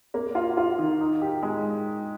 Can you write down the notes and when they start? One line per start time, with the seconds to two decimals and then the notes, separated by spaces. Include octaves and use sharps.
0.14 A#3
0.35 F4
0.57 F4
0.78 D#3
1.01 D#4
1.21 G4
1.43 G#3